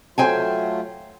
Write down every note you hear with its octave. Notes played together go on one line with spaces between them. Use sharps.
F#3 A3 F4 C5 G5 G#5